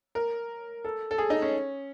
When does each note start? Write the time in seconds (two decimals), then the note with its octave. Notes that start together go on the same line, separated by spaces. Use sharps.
0.15 A#4
0.85 A4
1.11 A4
1.18 G#4
1.30 D#4
1.42 C#4